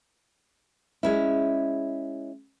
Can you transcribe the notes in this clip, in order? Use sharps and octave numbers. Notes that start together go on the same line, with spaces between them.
G#3 C#4 E4